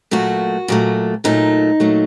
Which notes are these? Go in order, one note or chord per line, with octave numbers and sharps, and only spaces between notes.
A#2 F#3 A3 F#4
A#2 F#3 A3
A#2 F#3 A3 D#4
A#2 F#3 A3